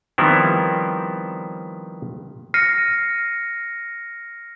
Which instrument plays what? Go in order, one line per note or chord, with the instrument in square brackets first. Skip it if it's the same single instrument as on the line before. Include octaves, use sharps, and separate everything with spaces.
[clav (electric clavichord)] D#3 F3 G3 B3 C4 E4
[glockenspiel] F6 A#6 C7 C#7 D#7